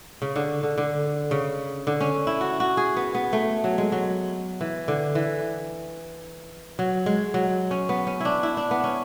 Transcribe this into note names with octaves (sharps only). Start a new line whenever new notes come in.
C#3
D3
D3
D3
C#3
D3
C#4
E4
F#4
F#4
G#4
B3
B3
A3
F#3
G#3
F#3
E3
D3
E3
F#3
G#3
F#3
C#4
B3
C#4
D4 E4
E4
D4
B3
C#4